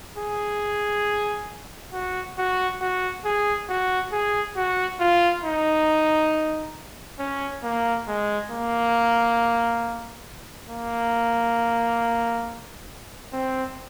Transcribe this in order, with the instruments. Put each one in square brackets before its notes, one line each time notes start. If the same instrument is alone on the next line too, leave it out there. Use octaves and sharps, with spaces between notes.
[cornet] G#4
F#4
F#4
F#4
G#4
F#4
G#4
F#4
F4
D#4
C#4
A#3
G#3
A#3
A#3
C4